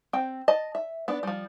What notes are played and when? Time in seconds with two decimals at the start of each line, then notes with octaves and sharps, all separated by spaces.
0.13 C4 G5
0.48 D#5 A5
0.75 E5
1.08 B3 D4
1.23 F3 G3